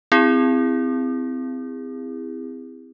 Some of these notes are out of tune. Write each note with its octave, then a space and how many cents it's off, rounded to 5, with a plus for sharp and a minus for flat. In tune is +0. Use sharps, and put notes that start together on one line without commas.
C4 -20 E4 +0 G#4 -35